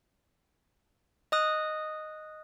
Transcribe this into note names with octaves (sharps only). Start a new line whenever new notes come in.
D#5 D#6 F#6